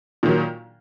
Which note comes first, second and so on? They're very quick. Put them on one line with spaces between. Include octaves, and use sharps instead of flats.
A#2 D#3 F#3